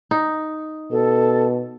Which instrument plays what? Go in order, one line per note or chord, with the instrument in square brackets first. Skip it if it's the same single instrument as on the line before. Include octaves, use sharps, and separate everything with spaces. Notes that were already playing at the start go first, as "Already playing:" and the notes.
[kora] D#4
[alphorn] B2 [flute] A4